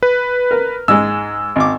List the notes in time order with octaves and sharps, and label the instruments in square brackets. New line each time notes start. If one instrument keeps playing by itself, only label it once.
[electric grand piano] B4
[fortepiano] A#4
[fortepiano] G#2 G#3 [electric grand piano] E6
[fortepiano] G#1 D6